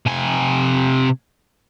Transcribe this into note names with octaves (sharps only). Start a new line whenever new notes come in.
C3 G#5